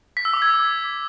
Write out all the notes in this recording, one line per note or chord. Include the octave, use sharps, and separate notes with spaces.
B6
E6
D6
G#6